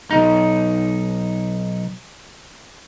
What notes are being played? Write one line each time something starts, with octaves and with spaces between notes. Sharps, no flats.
B1 F2 D#4